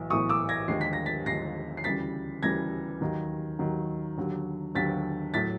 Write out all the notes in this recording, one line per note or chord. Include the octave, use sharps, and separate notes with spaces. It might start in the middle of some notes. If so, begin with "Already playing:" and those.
Already playing: B1 A2 E3
B1 A2 E3 C#6 D#6
D6 E6
G#6 A#6
D#2 D3 F3 G#3 C7
B6
A#6
A6 B6
D#2 D3 F3 G#3 A#6 C7
C7
D2 C#3 E3 G3 A6 B6
D2 C#3 E3 G3 G#6 A#6
D#2 D#3 F#3
D#2 D#3 F#3
D#2 D3 F#3
D#2 D3 F#3 A6 B6
A2 F#3 A6 B6